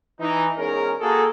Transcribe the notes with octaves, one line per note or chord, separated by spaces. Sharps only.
E3 D#4
E2 G#2 C#4 G#4 A#4
A#3 F#4 G#4 A4